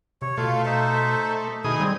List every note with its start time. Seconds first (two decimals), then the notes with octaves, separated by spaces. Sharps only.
0.22 C3 C#5
0.37 B2 A3 F4 F5
0.65 D#4 C5 E5
1.64 B2 D#3 E4 G#4 D#6
1.80 G3 C4